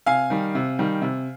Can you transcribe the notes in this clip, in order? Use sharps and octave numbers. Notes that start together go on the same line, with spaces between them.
C3 F5 G#5
D#3 G3
C3
D#3 G3
C3